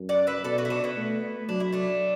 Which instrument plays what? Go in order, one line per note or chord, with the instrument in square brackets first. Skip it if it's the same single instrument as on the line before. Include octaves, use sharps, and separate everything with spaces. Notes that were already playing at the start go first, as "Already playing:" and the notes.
Already playing: [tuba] F#2
[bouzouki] D5 F#5
B4 E5
[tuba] B2 [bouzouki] A4 D5
[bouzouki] F#4 B4
E4
D4 F#4
B3 E4
[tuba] A3
[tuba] F#3 [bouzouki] D4
[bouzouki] E4
A3 D4